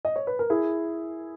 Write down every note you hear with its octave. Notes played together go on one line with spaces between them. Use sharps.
D#5
C#5
B4
A#4
E4 G#4